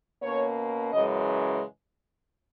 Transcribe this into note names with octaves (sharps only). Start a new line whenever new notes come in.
B2 A#3 C#4 C#5
F#2 C#3 E3 G#3 D#5